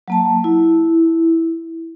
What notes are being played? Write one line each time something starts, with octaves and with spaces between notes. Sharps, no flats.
F#3 A#3 A5
E4